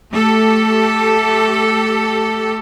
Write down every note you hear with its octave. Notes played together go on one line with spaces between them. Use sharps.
A3 G4 A4